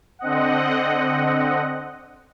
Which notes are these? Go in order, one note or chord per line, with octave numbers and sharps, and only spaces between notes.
D3 C4 D#5 F#5